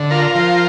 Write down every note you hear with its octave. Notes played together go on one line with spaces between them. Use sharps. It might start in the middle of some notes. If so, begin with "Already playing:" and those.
Already playing: D3
F4 A#4
F3